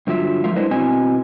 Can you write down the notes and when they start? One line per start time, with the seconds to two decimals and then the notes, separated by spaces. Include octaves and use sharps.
0.07 G2 D3 F#3 F4 E5
0.44 F3 G#3 A#4 E5 F5
0.56 D4 E4 B4 C5 D#5 F#5
0.71 B2 C4 E4 F#4 D#5 G#5